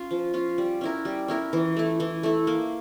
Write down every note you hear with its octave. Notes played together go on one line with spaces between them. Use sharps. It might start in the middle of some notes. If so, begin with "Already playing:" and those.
Already playing: C#4 F4
F3
C#4 F4
G3
C#4 E4 A#4
G3
C#4 E4 A#4
E3
A3 E4
E3
A3 E4
A#3